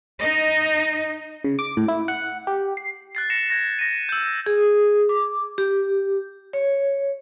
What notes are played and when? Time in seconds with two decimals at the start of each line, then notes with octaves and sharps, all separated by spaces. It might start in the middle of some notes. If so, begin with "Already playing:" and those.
0.19 D#4 D#5
1.44 C#3
1.59 D6
1.77 A2
1.88 E4
2.08 F#5
2.47 G4
2.77 C7
3.15 F#6 A6 C7
3.30 A#6 C#7 E7
3.50 G#6 A#6
3.79 A#6 D#7
4.09 E6 G6
4.46 G#4
5.09 D6
5.58 G4
6.53 C#5